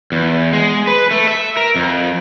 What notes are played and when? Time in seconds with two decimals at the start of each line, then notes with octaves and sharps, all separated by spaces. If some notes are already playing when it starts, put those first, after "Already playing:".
0.12 E2
0.53 G#3
0.87 B4
1.11 A3
1.27 E5
1.57 A#4
1.76 F2